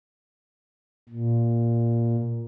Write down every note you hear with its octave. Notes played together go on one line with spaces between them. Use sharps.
A#2